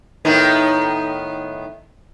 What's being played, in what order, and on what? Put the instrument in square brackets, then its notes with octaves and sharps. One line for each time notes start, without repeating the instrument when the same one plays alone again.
[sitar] A2 D#3 B3